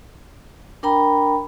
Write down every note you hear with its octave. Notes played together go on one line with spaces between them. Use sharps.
D4 A#4 G5 A#5 B5